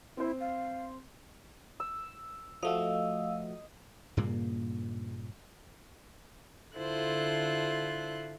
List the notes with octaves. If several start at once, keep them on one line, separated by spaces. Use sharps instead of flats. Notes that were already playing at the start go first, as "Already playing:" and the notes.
C4 E4 C5
F5
E6
F3 A3 F#4 D#5 F5 E6
G2 A#2 C#3 A#3
D3 E4 F4 A4 C5 F#6